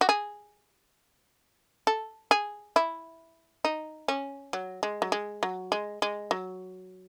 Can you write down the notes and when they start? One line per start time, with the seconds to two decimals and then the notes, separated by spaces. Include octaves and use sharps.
0.01 F#4
0.09 G#4
1.87 A4
2.31 G#4
2.76 E4
3.65 D#4
4.08 C#4
4.53 F#3
4.83 G#3
5.02 F#3
5.12 G#3
5.43 F#3
5.72 G#3
6.02 G#3
6.31 F#3